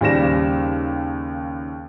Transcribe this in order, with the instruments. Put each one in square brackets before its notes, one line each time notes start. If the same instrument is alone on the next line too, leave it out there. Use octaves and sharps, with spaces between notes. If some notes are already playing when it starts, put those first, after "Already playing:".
[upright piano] D#2 C#3 G3 C5 A#6 E7